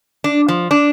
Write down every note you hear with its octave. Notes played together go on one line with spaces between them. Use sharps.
D4
F3
D4